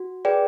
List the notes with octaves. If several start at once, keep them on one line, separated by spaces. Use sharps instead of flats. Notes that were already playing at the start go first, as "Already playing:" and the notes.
Already playing: F#4
G#4 B4 D5 G5